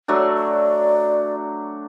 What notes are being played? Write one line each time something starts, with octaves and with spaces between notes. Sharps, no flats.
F#3 A3 D4
D5